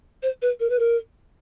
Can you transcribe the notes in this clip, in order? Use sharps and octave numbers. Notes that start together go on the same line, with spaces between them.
C5
B4
A#4
B4
A#4